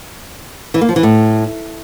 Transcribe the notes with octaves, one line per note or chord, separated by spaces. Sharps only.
E3
A#3
F3
E3
A2